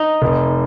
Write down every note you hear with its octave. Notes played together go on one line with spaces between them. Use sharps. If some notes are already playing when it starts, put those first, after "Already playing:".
Already playing: D#4
F1